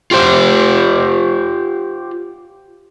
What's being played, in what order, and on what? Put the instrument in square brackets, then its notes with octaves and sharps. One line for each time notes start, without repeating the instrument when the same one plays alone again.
[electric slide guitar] F4 G4 C5